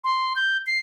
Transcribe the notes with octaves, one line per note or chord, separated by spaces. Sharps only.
C6
G6
C7